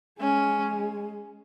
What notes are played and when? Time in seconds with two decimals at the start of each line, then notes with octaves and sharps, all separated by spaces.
0.19 G#3 C#4